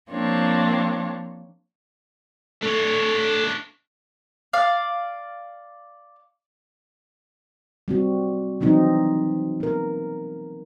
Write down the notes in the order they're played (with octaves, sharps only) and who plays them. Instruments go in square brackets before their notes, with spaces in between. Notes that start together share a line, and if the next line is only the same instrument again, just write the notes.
[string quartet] F3 A#3 C4 D4 C#5
[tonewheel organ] A3 A4 [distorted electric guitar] D4 C#5
[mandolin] D5 F5
[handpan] G3 C4 F#4
E3 F#3 C4 D#4
B3 A#4